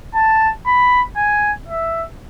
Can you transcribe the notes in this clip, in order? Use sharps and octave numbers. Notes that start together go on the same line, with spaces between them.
A5
B5
G#5
E5